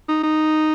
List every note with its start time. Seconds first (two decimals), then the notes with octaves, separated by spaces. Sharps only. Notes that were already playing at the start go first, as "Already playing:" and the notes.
0.08 D#4
0.23 D#4